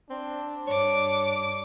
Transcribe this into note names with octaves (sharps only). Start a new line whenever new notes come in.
C4 D4
G2 C#5 D6